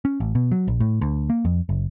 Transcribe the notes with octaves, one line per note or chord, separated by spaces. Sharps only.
C#4
A1
B2
F#3
A#1
A2
D2
A#3
F2
F#1